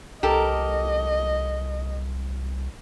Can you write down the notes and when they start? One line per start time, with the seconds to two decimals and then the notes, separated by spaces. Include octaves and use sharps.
0.23 C2 G4 A4 A#4 D#5